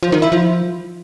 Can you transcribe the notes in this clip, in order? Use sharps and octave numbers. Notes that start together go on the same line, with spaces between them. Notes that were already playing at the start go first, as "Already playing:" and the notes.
F3
D#3
E4
F3